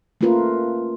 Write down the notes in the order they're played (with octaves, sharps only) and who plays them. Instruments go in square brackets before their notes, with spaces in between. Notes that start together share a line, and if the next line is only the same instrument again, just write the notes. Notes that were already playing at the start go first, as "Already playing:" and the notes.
[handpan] A3 A#3 C#4 F4 A#4 B4